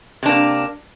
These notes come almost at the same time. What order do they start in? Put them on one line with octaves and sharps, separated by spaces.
C3 D4 A#3